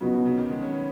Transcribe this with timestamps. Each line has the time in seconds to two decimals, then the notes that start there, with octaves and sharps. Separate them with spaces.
0.01 C#3 F#3 B3 D#4 F#4
0.14 B2
0.25 C#3
0.38 D#3
0.51 G#3
0.63 C#4
0.67 B3